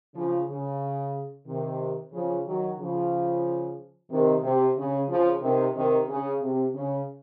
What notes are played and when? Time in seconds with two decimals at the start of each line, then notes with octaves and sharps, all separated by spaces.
0.15 C#3 F3
0.49 C#3
1.47 C3 D#3
2.13 C#3 F3
2.46 D#3 F#3
2.79 C#3 F3
4.11 C3 D#3
4.43 C3
4.77 C#3
5.09 C#3 F3
5.42 C3 D#3
5.75 C3 D#3
6.09 C#3
6.41 C3
6.74 C#3